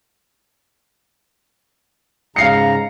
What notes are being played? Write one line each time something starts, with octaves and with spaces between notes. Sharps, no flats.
G#2 C#3 F5 A#5 C7 C#7